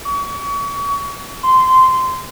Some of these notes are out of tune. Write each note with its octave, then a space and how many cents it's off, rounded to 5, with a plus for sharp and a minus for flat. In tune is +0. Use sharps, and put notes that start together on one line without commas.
C#6 +35
C6 -15